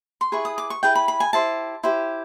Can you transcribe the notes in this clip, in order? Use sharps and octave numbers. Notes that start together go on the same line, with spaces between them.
C6
E4 G#4 B4 C#6
D#6
D6
C#6
E4 G#4 B4 G5
B5
B5
G#5
E4 G4 C5 A5
E4 G4 C5